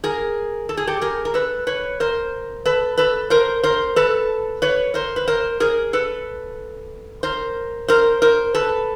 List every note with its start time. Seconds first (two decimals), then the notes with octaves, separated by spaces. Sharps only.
0.04 G#4 A#4
0.69 A4
0.77 G#4
0.87 G4 A4
1.02 G#4 A#4
1.25 A#4
1.34 A4 B4
1.67 B4 C#5
2.00 A#4 C5
2.65 A4 B4
2.98 A4 B4
3.30 A#4 C5
3.63 A#4 C5
3.96 A4 B4
4.62 B4 C#5
4.94 A#4 C5
5.16 B4
5.28 A#4 C5
5.60 G#4 A#4
5.93 A4 B4
7.23 A#4 C5
7.88 A#4 C5
8.22 A#4 C5
8.54 A4 B4